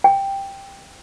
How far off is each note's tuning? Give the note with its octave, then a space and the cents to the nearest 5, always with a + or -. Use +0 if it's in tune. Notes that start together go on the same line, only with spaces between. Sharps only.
G5 +5